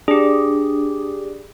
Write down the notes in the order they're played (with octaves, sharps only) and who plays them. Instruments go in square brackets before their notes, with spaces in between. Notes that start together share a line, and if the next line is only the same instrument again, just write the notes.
[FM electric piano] D4 [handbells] G4 G#4